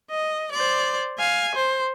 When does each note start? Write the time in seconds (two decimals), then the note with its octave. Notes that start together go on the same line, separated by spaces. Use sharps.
0.10 D#5
0.52 C5 D5
1.18 F5 G#5
1.55 C5